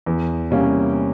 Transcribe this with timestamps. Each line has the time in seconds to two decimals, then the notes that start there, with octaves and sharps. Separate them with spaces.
0.06 E2
0.51 C3 G3 A#3 C#4